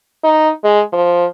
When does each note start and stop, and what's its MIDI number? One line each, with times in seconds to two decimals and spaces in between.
0.24 0.50 63
0.64 0.81 56
0.93 1.25 53